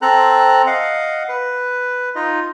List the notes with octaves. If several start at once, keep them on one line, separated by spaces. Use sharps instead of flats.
C4 A4 A#5 F#6
D#5 F5 F#5
B4
D#4 F4 D#5